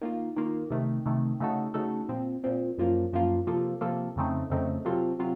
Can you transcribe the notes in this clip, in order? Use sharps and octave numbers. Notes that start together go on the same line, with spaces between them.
D#3 A#3 F4
D#3 A#3 F4
C3 D#3 A3
C3 D#3 A3
C#3 A3 D#4 F#4 A4
C#3 A3 D#4 F#4 A4
A#2 F3 C4
A#2 F3 C4
F#2 F3 A#3 F4
F#2 F3 A#3 F4
C3 F3 A#3 F4 A4
C3 F3 A#3 F4 A4
F2 C#3 A3 C4 D#4
F2 C#3 A3 C4 D#4
C3 F#3 C4 F4 A4
C3 F#3 F4